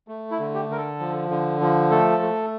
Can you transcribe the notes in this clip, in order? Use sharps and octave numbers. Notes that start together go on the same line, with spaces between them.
A3
E4
D3
G4
D3 A#4
A4
F3
D3
F3
A3 A4
A3